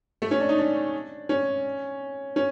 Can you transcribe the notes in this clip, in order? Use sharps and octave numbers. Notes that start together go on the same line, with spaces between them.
A3
C#4
D4
D#4
D4
C#4
C#4